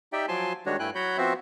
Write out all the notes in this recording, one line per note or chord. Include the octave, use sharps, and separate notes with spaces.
D#4 G4 D5 E5 G5
F3 F#3 G#5 A5 C6
D#3 G3 G#3 D4 F#4 C#5
G2 A3 E4 G5 G#5 F#6
F#3 F#4 C#5 F#5 B5 G6
F3 B3 C4 F#4 C5 E5